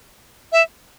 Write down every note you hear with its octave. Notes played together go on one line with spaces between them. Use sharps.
E5